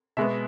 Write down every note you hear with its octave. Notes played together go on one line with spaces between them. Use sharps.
B2 G#3 B3 E5